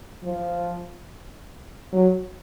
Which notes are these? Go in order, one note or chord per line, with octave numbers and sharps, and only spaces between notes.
F3
F#3